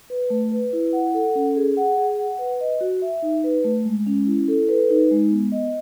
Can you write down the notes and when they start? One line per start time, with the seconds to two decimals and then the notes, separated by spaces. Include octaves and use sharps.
0.10 B4
0.30 A3
0.52 B4
0.73 E4
0.93 F#5
1.14 A4
1.35 C#4
1.56 G#4
1.77 F#5
1.98 G#4
2.18 F#5
2.39 B4
2.61 D#5
2.81 F#4
3.02 E5
3.22 D#4
3.44 B4
3.64 A3
3.85 G#3
4.07 C#4
4.27 E4
4.48 A4
4.69 B4
4.90 D#4
5.11 G#3
5.31 B3
5.52 D#5